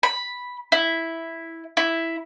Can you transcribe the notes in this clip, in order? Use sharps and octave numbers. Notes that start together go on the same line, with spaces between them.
B5
E4
E4